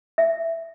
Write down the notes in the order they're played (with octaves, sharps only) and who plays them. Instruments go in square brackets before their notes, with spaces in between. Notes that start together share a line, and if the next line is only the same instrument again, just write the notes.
[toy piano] E5